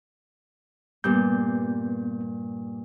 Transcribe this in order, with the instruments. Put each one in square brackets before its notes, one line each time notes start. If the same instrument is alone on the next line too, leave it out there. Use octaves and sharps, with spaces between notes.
[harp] G2 A#2 [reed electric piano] B3 G6